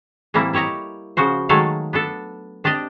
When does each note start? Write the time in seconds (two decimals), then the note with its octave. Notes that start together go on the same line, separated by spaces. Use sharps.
0.34 A2 E3 G3 A#3 C4 E4
0.53 E4 G4 C#5 D#5 A#5
1.17 C#3 F3 F#4 C5
1.49 D#3 F#3 G#3 A3 A4 F5
1.93 B3 D4 A4
2.64 C4 D4 G4 D5 D#5